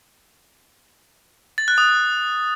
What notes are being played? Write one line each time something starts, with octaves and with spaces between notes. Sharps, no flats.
A6
F#6
D#6